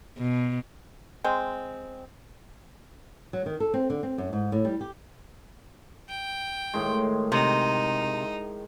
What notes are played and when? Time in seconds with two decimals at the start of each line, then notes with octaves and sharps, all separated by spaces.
0.17 B2
1.24 G#3 C4
3.33 F#3
3.46 D#3
3.60 A4
3.74 C4
3.90 D3
4.03 C4
4.18 F#2
4.33 G#2
4.52 A2
4.65 G3
4.81 G4
6.08 G5
6.74 A2 D#3 G#3
7.32 C3 D#4